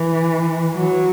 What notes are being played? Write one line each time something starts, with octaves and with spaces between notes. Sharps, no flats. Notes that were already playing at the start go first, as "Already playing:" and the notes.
Already playing: E3
F#3